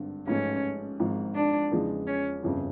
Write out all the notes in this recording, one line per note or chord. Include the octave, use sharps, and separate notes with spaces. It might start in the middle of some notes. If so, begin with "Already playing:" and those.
Already playing: G#1 G2 D3
A1 G#2 F3 A3 C#4
G#1 G#2 F3
D4
E2 C#3 F3 G#3
C#4
G1 F2 C#3